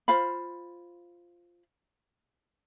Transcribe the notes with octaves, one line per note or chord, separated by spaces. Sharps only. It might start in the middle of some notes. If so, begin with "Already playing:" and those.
F4 C5 F5 B5